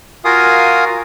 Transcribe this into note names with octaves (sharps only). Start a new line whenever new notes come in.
F4 F#4 A#4 F5 G#5 D#6